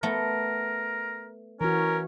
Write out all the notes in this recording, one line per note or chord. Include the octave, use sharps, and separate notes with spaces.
A3 B3 A#4
E3 C#4 F#4 A#4